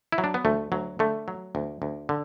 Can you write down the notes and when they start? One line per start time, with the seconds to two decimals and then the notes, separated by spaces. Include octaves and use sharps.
0.12 E4
0.18 F#3
0.24 D4
0.34 B3
0.45 D2 A3
0.72 D2 F#3
0.99 D3 A3
1.28 F#3
1.55 D2
1.82 D2
2.09 D3